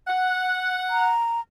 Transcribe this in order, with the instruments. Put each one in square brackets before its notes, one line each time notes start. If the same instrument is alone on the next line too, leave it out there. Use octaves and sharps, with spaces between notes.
[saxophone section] F#5
[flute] A#5